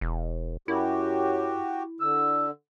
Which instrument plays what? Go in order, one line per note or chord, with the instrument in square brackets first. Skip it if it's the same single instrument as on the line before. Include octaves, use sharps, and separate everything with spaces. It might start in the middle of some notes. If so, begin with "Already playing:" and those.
[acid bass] E1
[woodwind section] F#2 [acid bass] E4 [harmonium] F#4 G4
[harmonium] D3 [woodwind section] E6